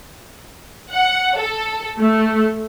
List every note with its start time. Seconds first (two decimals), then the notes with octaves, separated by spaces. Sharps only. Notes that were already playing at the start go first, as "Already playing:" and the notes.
0.91 F#5
1.36 A4
1.99 A3